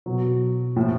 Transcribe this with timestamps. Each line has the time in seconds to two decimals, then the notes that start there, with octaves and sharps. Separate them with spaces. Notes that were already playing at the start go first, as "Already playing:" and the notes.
0.06 B2 F#3
0.76 A2 F3